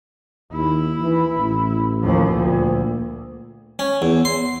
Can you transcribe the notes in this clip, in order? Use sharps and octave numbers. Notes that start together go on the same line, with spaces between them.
D#2 E4
E3
A1
D#2 F3
D2 A#2
C#4
E2
C6